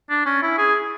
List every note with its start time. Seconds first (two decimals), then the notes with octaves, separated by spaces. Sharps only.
0.10 D4
0.26 C#4
0.42 E4
0.58 G#4